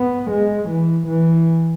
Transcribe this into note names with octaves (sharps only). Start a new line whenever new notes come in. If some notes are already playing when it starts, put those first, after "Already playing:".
Already playing: B3
G#3
E3
E3